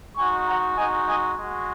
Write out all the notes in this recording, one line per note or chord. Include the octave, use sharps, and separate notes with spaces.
G#3 D#4 F#4 G#5 C#6
F#5 A#5
G#3 D#4 F#4 D#5 G#5
D#5 G#5
G#3 F#4